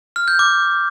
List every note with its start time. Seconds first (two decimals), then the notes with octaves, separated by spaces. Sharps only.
0.16 F6
0.28 G6
0.39 D6